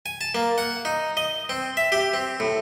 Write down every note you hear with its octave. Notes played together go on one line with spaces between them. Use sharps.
G#5
A5
A#3
F#5
D#4
D#5
C4
E5
G4
C4
A2